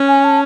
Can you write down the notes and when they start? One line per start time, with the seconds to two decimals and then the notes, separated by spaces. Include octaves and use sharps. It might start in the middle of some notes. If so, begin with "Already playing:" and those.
Already playing: C#4
0.08 G#5
0.24 A5